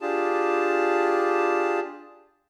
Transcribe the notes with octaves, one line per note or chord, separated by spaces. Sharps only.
D4 F4 G4 G#4 A5